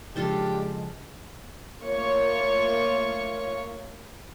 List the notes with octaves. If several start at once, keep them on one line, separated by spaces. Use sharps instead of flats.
C#3 F3 G#3 D4 F4 G4 A4 C5
A3 A#3 F4 C#5 C#6